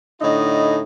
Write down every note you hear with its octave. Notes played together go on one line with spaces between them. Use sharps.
A2 D3 D#4 E4 D#5